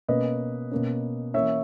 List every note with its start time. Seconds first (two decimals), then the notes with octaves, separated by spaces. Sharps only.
0.08 B2 A#3 C#4 B4 D#5
0.71 B2 A#3 C#4
1.34 E3 A#3 C#4 C#5 E5